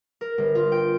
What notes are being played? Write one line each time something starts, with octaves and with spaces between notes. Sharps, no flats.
A#4
G1
F4
G5